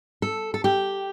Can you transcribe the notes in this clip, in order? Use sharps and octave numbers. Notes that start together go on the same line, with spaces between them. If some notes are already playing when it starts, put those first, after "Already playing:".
A4
A4
G4